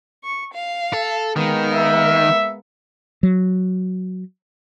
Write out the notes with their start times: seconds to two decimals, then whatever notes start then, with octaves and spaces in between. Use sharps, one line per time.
0.24 C#6
0.54 F5
0.93 A4
1.36 D#3 G#3 A#3 B3
1.74 E5
3.23 F#3